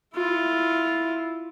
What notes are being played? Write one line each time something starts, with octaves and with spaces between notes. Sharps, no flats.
E4 F4